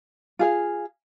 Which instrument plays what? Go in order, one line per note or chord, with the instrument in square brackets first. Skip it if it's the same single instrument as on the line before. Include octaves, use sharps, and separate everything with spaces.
[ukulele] F4 G#4 F5